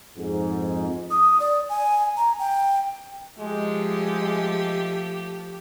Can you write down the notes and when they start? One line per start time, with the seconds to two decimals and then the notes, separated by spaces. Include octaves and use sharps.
0.17 F2 G#2
1.10 D#6
1.40 D5
1.69 G#5
2.17 A#5
2.39 G5
3.39 F3 G#3 A3 G4